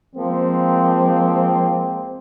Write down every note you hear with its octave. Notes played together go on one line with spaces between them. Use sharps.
F3 G#3 A#3 C4